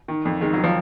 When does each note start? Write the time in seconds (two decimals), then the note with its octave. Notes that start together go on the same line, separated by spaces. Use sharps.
0.08 D#3
0.25 F2
0.41 D#3 G#3
0.53 F#3
0.58 D#3
0.64 F3